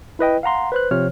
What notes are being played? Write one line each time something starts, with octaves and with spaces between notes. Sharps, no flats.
E4 B4 D#5 G5
F5 F#5 A#5 C6
B4 C5 F#6
C3 F3 C5 C#5 F6